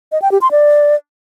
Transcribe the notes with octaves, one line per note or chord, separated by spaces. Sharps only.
D#5
G5
G4
C6
D5